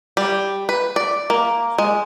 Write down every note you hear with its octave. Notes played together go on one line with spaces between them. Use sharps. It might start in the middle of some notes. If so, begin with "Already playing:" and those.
G3
B4
D5
A#3
G#3